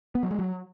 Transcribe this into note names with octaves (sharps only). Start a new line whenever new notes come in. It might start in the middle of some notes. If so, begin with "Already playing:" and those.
B3
F#3
G#3
F#3